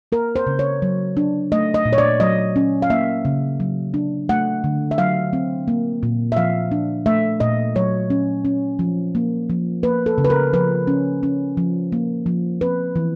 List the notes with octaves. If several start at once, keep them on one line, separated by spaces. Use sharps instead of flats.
A#3 A#4
C5
C#3
C#5
F#3
D4
A3 D#5
D#5
A#2
C#5
D5
F#3 D#5
C#4
F5
A#3 E5
C#3
F#3
D4
A3 F#5
D3
E5
F#3 F5
C4
A#3
A#2
E5
F3 F5
D4
A3 E5
A#2 D#5
F#3 C#5
C#4
C#4
F3
A#3
F3
A#3 B4
A4
C#3
B4
A#4
F3 B4
C#4
C#4
F3
A#3
F3
C4 B4
E3